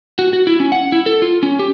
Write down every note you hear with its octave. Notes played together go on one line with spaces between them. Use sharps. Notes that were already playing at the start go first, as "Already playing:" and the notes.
F#4
F#4
E4
C#4
F#5
E4
A4
F4
C#4
G4